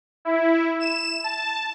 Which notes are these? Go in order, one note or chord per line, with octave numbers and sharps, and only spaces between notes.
E4
E7
A5